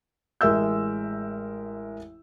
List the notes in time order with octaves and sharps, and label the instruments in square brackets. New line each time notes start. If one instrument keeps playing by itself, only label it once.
[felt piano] A1 G#3 A#4 E5 E6 G6